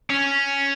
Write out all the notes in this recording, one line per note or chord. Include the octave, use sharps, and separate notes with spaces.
C#4